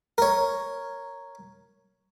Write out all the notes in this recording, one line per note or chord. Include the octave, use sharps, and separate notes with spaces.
A#4 C#5